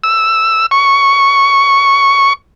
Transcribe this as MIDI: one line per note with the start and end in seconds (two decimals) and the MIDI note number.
0.04 0.66 88
0.71 2.33 85